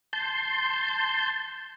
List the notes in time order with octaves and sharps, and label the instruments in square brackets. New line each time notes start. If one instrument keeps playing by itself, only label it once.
[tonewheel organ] A5 C6 G6